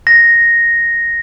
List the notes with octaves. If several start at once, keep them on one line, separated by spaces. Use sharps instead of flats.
A#6